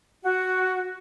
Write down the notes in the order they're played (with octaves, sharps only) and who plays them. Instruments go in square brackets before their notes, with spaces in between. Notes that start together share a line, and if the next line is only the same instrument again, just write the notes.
[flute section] F#4